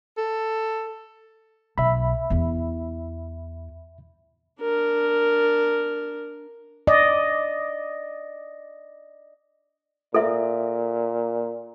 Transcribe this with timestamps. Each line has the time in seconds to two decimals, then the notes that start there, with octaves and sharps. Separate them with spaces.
0.18 A4
1.78 B1 E5 B5
2.30 E2 E4
4.61 D4 A#4
6.87 D5 D#5
10.14 A#2 A4 E5